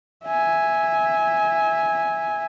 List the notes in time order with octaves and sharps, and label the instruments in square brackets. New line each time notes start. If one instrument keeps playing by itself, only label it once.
[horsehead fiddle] E5 G#5